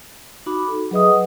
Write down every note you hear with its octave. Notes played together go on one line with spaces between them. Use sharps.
D#4 F#4 B5 D6
A4
F#3 G#4 B4 D#5 E5 D#6
B4 F#5